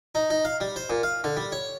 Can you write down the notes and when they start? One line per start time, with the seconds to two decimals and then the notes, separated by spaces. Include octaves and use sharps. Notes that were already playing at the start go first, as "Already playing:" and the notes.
0.15 D#4
0.30 D#4
0.45 F5
0.60 G3
0.76 C5
0.90 A#2
1.03 F5
1.24 D3
1.37 G3
1.52 C#5